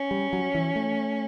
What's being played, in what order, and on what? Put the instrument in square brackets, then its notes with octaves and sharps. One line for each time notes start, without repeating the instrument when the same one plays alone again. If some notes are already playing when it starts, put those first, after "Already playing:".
Already playing: [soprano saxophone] C#4
[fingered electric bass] G3
F#3
E3
A3